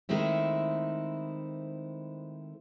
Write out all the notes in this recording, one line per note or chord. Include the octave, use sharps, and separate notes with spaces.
D#3 G#3 A3 C4 E4